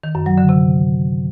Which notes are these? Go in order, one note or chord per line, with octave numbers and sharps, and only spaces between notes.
D#3
F#2
F#3
D3
C3